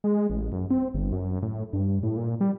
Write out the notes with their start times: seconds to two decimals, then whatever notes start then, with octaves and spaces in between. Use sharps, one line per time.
0.04 G#3
0.30 A1
0.52 F#2
0.71 C4
0.94 G1
1.12 F#2
1.43 A2
1.73 G2
2.03 A2
2.17 A#2
2.41 G3